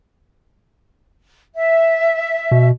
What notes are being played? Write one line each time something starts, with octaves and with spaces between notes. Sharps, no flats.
E5
B2